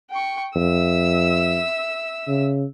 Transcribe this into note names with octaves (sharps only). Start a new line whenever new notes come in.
G5 C#6
F2 E5 E6
C#3